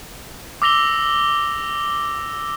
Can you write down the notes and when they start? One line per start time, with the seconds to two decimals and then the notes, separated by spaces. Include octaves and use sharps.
0.62 D6 E6 A#6 F7 G7